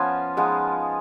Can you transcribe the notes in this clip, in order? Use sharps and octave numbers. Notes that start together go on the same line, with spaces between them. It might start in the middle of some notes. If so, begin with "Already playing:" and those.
Already playing: F3 B3 C#4 F4 G#5
F3 G#3 B3 D#4